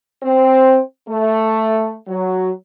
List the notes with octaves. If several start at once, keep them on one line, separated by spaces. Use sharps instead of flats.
C4
A3
F#3